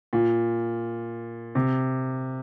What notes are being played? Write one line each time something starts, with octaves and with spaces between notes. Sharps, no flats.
A#2
C3